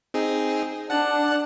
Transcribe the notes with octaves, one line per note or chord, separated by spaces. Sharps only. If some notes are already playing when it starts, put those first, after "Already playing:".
C4 D#4 G#4
D4 F#5 A5 F#6